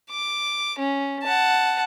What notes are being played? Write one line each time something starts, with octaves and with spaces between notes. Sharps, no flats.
D6
C#4
F#5 A5